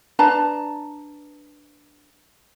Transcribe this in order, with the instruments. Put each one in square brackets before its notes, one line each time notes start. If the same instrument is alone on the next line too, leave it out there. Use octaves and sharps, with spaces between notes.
[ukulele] D4 B4 A5 A#5